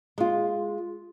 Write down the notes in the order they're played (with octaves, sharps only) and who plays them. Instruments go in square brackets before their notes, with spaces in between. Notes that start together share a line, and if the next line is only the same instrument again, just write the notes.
[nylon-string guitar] G#3 F4